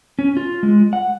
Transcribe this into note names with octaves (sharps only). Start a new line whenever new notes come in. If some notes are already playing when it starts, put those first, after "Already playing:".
C#4
F4
G#3
F#5